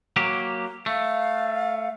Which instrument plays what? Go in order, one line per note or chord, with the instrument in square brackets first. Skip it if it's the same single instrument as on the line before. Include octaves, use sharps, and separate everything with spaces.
[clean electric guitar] F#3 A#3 G4
[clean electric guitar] A3 [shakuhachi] F5